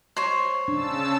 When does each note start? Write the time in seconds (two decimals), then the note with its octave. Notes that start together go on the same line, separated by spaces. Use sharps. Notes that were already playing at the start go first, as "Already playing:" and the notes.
0.16 C5 C#5
0.68 C#3 D4 A5 E6